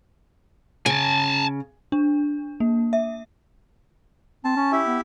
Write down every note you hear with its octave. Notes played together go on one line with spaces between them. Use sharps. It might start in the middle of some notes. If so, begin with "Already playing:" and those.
C#3 G#5 A5
D4
A#3
E5
C4 A5
C#4
E4 G4 E5
B3